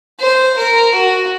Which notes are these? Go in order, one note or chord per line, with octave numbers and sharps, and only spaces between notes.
C5
A#4
F#4